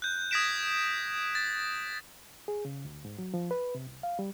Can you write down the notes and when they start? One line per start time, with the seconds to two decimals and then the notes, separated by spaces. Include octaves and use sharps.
0.02 F#6 G6
0.31 D#6 G#6 A#6 B6 D7 E7
1.35 A6
2.48 G#4
2.65 C#3
2.85 D2
3.05 G#2
3.19 F#3
3.34 F3
3.51 B4
3.75 C3
3.87 C2
4.03 F5
4.19 G3